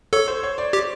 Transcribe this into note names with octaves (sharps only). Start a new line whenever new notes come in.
A4 C#5
C5
C#5
D5
G4